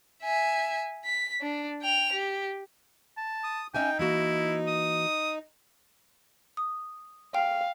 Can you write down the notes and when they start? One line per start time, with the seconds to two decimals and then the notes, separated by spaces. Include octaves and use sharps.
0.23 E5 G#5
1.05 B6
1.41 D4
1.82 G5 F7
2.13 G4
3.17 A5
3.44 D#6
3.75 C#4 D#4 E5 G5 G#5
3.99 E3 A#3 E4 F#4
4.67 D#6
6.57 D#6
7.34 F5 G5